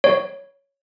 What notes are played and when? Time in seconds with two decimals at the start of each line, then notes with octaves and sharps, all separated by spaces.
0.04 C#5